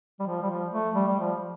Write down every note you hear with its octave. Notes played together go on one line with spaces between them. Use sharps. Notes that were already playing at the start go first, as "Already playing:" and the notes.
G3
F3
G3
F3
A3
G3
G3
F3